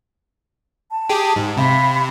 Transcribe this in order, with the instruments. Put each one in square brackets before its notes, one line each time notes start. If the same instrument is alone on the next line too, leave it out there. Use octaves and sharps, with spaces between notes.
[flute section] A5
[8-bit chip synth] G4 G#4
G#2
[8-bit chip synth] C3 [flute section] E5 F5 B5